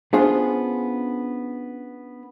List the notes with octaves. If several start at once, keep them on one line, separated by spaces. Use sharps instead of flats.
B3 C#4 D4 F4 G#4 C5